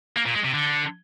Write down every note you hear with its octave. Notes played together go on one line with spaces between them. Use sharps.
A#3
A#2
G#3
C3
D3